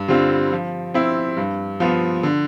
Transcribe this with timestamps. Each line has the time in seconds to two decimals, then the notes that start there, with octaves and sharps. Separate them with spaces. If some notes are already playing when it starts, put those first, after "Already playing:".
Already playing: G2
0.08 D3 G3 C4 F4
0.52 F3
0.94 C4 E4
1.37 G2
1.80 F3 B3 F4
2.23 D3